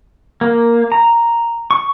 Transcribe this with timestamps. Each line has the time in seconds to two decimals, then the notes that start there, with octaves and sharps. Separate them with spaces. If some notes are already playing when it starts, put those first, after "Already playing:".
0.41 A#3
0.92 A#5
1.71 C#6